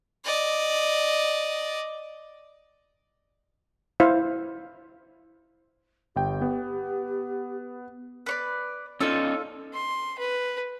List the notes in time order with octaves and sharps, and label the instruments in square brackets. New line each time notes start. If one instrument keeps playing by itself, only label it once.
[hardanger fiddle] D5 D#5
[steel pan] E4 C5 F5
[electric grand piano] G1 G5 [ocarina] G4
[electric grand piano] B3
[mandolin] B4 C#5 D5
[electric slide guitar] C#4 D#4 [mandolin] F4 A4 E6
[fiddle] C6
B4